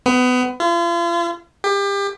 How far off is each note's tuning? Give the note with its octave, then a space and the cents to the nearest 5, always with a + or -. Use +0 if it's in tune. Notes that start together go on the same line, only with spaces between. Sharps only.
B3 +25
F4 -40
G4 +30